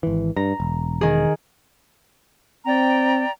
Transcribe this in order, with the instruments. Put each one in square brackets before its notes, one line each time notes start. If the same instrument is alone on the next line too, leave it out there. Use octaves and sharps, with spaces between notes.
[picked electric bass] G#1 E3
[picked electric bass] G2 [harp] A#5
[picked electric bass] E1
[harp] D#3 G#4
[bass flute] C4 [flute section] D5 G5 A#5